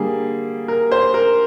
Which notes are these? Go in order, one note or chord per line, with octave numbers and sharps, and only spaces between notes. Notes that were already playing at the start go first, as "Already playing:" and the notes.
Already playing: D3 G3 A#3 G#4
A#4
C5
A#4